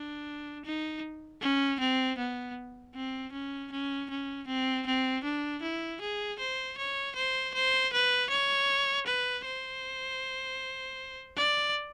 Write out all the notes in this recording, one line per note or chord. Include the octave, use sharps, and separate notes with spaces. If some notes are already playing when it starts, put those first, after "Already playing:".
Already playing: D4
D#4
C#4
C4
B3
C4
C#4
C#4
C#4
C4
C4
D4
E4
G#4
C5
C#5
C5
C5
B4
C#5
B4
C5
D5